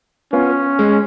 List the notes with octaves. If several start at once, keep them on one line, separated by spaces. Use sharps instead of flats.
B3 C#4 F4
G#3